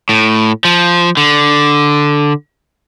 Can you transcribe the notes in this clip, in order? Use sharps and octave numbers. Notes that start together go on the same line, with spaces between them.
A2
F3
D3